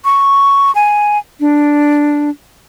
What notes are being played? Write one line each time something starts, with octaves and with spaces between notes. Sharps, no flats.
C#6
G#5
D4